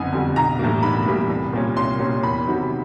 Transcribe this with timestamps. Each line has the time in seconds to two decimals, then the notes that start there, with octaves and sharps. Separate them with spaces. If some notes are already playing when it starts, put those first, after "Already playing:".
Already playing: F#1 F2 D3 B3 G#5
0.12 F2 D3 G3 B3
0.36 B1 A#5
0.59 A2 E3 G3 A#3
0.83 B1 B5
1.06 A2 E3 G3 A#3
1.29 C2
1.53 A#2 G3 A#3 C#4
1.76 C2 C6
2.00 A#2 G3 A#3 C#4
2.23 E2 B5
2.47 C3 D#3 F#3